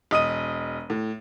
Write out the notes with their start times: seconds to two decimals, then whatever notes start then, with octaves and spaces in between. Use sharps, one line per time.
0.11 E1 D#5 D#6 D#7
0.90 A2